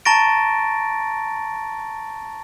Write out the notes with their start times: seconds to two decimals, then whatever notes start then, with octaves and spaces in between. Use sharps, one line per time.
0.05 A5 A#5 C#6 A6 A#6 D7